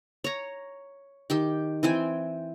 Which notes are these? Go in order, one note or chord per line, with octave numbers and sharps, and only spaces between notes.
C#5 A#5
D#3 G4 G5
E3 C4 G5 G#5